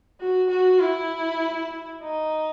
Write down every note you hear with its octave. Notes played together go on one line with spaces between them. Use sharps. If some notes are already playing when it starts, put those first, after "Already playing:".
F#4
F#4
E4
D#4